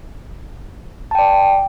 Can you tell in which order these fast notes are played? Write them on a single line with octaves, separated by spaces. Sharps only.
A5 G5 D5